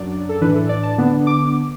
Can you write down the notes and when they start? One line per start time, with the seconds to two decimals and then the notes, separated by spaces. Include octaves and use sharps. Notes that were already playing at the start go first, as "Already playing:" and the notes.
Already playing: F#2 F#3 D4 D5
0.29 A4
0.41 A2 E3 D4 B4
0.55 A4
0.69 D5
0.83 A5
0.98 D3 B3 D4
1.27 D6